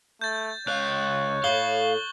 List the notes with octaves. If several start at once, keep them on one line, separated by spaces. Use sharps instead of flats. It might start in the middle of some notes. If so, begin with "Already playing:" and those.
A3 G6 A6
C#2 C#5 F5 F#6
A2 A3 F5 C#6 F#7 G7